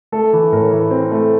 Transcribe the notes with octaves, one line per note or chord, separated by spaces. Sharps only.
A3 A4
E3
A2 A#4
E3
C4
A3